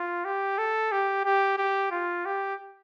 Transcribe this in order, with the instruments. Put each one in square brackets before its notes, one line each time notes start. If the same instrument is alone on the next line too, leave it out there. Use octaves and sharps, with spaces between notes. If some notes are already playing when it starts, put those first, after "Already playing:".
Already playing: [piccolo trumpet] F4
G4
A4
G4
G4
G4
F4
G4